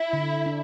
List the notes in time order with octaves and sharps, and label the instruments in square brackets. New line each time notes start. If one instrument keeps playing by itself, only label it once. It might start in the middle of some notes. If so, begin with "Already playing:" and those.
Already playing: [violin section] E4
[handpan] D3
D4